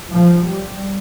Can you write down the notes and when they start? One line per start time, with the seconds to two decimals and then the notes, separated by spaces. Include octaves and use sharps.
0.12 F3
0.45 G3